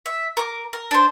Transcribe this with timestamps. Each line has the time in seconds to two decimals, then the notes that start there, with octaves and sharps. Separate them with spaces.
0.06 E5
0.37 A#4 D6
0.73 A#4
0.91 D4 C5